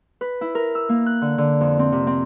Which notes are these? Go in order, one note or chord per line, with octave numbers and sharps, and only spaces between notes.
B4
E4
A#4
E6
A#3
F#6
D3
D3
F2
C4
C3
C4